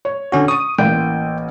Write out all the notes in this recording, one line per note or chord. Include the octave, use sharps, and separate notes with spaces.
C#5
D3 C#4 F#4
C#6 D#6 D#7
A1 A#3 G5